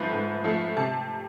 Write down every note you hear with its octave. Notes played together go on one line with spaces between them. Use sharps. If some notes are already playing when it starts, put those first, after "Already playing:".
Already playing: G#2 F3 A3 B4
G#2
F3 A3
C3 A5